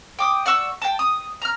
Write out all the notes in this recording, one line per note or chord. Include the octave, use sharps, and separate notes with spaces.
G5 D6 D#6
D5 F#5 C#6 E6
G5 A5
D#6
A#5 F6